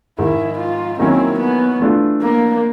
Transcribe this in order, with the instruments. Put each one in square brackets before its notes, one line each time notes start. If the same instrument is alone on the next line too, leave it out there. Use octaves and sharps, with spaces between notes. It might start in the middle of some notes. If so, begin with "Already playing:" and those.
[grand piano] G#2 D#3 G#3 [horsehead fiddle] E4
[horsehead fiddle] F4
[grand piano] D#3 F#3 A#3 C#4 E4 [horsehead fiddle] C4
[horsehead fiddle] B3
[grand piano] E3 A3 D4 F4
[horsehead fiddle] A#3